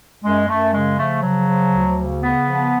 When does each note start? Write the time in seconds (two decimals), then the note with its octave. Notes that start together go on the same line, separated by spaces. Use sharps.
0.23 F#2 G#3
0.49 F#2 A3
0.74 C#3 G#3
0.98 F3 A3
1.23 C#3 F#3
1.48 F3
1.74 D2
1.98 C#3
2.23 C#3 B3
2.47 F3